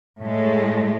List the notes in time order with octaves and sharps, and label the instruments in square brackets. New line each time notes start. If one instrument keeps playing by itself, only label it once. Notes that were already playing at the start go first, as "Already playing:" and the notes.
[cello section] A2 G#3